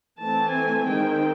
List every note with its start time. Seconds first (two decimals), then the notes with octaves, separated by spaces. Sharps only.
0.20 E3 A3 C4 A5
0.53 G#5
0.87 D#3 G#3 C4 G5